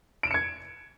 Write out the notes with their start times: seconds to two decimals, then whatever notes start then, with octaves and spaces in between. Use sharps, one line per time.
0.23 D7
0.27 E7
0.31 C#7
0.34 G#6